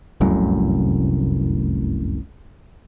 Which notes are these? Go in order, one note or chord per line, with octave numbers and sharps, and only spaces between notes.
F1 C2 F#2 A2